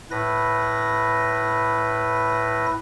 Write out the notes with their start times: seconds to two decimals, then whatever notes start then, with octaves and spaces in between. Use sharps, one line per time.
0.11 A2 B4 A#6